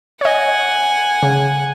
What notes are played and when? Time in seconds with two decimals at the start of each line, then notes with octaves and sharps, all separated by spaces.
0.21 C#5 D#5 F#5 G#5
1.23 C#3